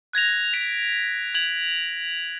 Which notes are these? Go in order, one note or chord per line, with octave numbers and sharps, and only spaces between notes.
F#6 G#6 A#6 F7
B6 D7 F7
G#6 F7 F#7